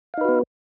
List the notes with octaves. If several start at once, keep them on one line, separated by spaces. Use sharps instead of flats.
B3 D#4 F#4 B4 F5